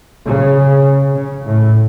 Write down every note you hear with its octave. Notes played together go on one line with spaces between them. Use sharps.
C#3
C#3
A2